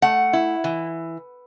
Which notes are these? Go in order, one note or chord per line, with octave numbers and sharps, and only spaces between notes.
A3 F#5
E4
E3